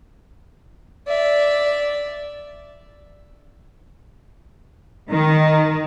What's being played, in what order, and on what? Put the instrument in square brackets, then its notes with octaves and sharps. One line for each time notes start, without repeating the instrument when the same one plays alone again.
[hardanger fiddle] D5 E5
[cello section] D#3